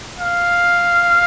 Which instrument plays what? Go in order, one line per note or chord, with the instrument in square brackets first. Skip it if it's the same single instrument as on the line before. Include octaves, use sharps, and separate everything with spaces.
[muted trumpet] F5